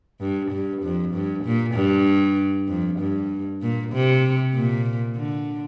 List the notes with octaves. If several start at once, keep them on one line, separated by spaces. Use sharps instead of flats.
G2
G2
F2
G2
A#2
G2
F2
G2
A#2
C3
A#2
D3